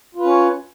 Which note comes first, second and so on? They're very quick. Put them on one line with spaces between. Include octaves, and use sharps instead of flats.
F4 B4 C#4 C#5